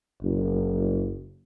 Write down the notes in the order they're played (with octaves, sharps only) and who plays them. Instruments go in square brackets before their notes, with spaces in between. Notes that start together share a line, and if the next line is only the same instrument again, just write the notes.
[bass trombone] F#1